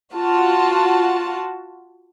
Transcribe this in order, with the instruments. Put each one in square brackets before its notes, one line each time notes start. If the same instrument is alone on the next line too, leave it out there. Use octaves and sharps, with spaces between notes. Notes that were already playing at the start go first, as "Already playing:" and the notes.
[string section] F4 F#4 A5